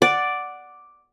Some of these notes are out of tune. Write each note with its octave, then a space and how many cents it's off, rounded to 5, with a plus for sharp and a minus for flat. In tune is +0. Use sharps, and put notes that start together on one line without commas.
D5 +0 F#5 +0